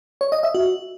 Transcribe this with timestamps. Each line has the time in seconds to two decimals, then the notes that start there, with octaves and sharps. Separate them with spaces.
0.21 C#5
0.32 D#5
0.43 E5
0.55 F#4